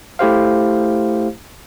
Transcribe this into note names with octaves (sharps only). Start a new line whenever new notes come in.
A3 E4 G4 C5 F5